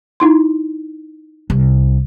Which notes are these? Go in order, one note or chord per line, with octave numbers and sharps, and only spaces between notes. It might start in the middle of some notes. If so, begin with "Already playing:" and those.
D#4 E4 C6
C2